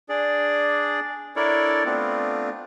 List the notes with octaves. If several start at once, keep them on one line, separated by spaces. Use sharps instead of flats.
D4 G#4 D5
D4 E4 A4 A#4 C#5 D5
A3 B3 C4 D4 F4